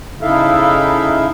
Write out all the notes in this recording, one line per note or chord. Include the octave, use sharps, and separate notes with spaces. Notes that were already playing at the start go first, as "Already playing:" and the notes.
C#3 D#4 E4 A4 E5 F5